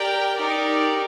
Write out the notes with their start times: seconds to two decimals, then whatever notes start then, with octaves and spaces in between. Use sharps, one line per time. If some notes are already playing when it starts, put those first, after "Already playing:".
Already playing: G4 A#4 D5 G5
0.36 D#4 G4 A#4 D5